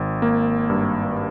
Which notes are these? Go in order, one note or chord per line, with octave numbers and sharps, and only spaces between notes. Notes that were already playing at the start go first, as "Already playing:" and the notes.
Already playing: G#1
A#3
G2